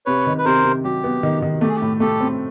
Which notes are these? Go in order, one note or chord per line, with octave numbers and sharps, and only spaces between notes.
C3 B4 C#5
D#3
B4
C3 A#4 C5
C3
F#3 G4
B3
D#3
D#3
A3 G4
G#4
G4
A2
A3 G4 A4
C4